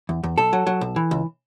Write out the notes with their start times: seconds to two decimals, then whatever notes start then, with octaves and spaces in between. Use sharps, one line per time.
0.09 E2
0.23 E2
0.38 B1 A4
0.53 F#3
0.67 F#3
0.81 B1
0.96 E3
1.11 C#2